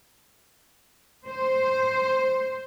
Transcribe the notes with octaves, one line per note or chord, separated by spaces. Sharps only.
C5